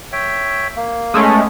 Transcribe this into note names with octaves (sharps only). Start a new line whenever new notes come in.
C#5 E5 G5
A#3
G#3 A3 C#4
B3